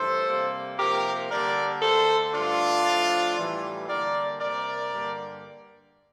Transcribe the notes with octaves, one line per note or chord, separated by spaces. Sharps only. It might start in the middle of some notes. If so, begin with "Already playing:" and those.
Already playing: G2 E3 A3 A4 C5
C3 G3 A#3
C3 F3 A#3 G4 A#4
D3 G3 A#3 A#4 D5
D3 A3 A4 C5
G2 D3 A3 D4 F4
A2 F3 A3
A2 E3 G3
D3 G3 A#3 A#4 D5
C3 G3 A#3 A#4 D5
G2 D3 G3 A#3